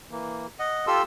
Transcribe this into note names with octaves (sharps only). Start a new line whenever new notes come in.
E3 A#3
D#5 F#5
F4 G4 A4 C6 E6